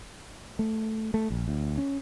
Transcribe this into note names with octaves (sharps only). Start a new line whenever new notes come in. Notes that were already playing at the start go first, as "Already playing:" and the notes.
A3
A3
A#1
D2
C#4